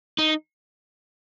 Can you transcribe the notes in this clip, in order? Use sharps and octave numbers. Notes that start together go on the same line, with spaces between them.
D#4